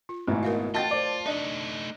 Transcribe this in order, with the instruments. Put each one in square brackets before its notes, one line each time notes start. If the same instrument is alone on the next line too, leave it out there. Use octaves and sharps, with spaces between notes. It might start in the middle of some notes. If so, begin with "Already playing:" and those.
[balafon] F4
[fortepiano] G#1 G#2 E4 [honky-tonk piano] B2 [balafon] A3
[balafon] A#4 D#5 F5
[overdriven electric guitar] F4 [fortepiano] F#4 G5 [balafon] D#5 [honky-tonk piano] A5 A6
[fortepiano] C5 D5
[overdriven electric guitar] A3 D#4 [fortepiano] D4 D#5 [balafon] D5